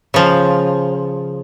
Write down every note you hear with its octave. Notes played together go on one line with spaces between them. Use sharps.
C#3 F3